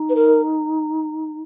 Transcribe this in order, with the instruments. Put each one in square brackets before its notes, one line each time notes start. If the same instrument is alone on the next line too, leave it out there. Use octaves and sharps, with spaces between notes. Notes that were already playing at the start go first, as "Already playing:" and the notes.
Already playing: [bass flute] D#4
[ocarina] B4
A#4